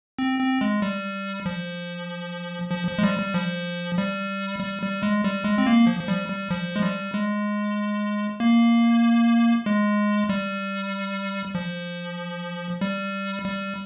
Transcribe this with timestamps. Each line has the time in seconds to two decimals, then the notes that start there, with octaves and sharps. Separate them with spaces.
0.19 C4
0.40 C4
0.61 G#3
0.82 G3
1.46 F3
2.71 F3
2.87 F3
2.98 G#3
3.03 G3
3.19 G3
3.34 F3
3.98 G3
4.60 G3
4.82 G3
5.03 G#3
5.24 G3
5.44 G#3
5.58 C4
5.66 A#3
5.87 F3
6.00 F3
6.08 G3
6.29 G3
6.50 F3
6.76 G#3
6.82 G3
7.14 G#3
8.40 A#3
9.66 G#3
10.29 G3
11.55 F3
12.81 G3
13.45 G3